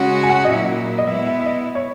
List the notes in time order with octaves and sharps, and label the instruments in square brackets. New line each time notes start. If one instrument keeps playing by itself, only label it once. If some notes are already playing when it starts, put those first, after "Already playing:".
Already playing: [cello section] C#3 G#3 C#4 F#4
[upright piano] G#5
F#5
D#5
[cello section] A#2 F#3 A#3 E4 [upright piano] E5
[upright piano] D#5
[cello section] B2 G#3 B3 E4 [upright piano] E5
[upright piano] E5
E5
D#5
C#5